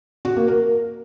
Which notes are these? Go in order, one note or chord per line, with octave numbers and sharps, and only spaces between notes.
F#4
A#3
A#4